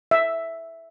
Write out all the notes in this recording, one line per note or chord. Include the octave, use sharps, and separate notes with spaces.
E5